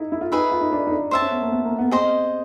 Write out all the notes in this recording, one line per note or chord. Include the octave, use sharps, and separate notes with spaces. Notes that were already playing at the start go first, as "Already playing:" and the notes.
Already playing: D#4 E4
E4
F4
D#4 G#4 B4 E5
F4
D#4
D4
D#4
D4
C#4 C5 E5 A5
C#4
B3
A#3
B3
A#3
B3
C4 G#4 C5 D#5